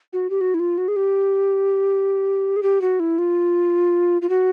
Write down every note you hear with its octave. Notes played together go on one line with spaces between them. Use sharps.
F#4
G4
F#4
E4
F4
F#4
G#4
G4
G#4
G4
F#4
E4
F4
F4
F#4